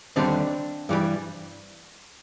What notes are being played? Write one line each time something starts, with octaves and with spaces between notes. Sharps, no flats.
D#2 D3 G3 C4 D4
G2 E3 G3